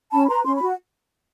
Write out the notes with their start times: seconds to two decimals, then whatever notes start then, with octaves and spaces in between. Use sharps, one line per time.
0.12 C#4 A5 B5
0.23 B5
0.28 B4 A#5 C6
0.44 C#4 C6
0.55 B5
0.61 F#4